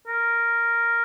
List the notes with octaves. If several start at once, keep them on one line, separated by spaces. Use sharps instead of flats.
A#4